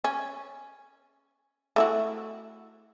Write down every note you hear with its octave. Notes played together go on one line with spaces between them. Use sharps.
C#4
A3 E4 F#4